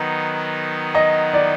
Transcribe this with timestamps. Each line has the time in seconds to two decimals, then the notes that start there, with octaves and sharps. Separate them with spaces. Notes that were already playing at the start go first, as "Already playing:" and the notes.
Already playing: D#3 F#3 B3 D#4
0.95 D#5
1.34 D5